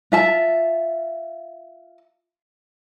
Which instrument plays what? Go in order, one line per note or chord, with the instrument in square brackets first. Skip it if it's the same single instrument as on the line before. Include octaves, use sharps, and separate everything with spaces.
[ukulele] F4 E5 A5